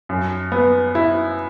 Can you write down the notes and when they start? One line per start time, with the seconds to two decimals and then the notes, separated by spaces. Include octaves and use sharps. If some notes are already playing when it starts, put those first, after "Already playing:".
0.09 F#2
0.52 B3
0.95 E4